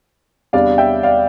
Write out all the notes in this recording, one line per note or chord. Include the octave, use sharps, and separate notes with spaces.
E2 C3 G3 D4 D5 F5
E5 G5
D5 F5